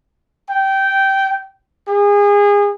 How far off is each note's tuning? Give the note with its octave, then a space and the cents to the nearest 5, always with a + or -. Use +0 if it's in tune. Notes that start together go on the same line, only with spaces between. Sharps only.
G5 -15
G#4 -30